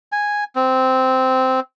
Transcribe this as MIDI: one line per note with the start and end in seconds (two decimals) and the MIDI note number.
0.12 0.44 80
0.56 1.60 60